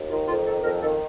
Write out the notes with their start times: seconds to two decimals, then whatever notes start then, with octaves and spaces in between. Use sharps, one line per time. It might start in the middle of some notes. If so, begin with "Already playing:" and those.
Already playing: D#2
0.09 D#3 F4
0.28 F2 F4
0.46 D#3 A4
0.63 F2 A#4
0.82 D#3 A4